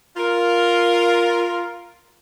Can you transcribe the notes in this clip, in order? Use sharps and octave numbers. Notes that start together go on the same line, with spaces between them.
F4 A#4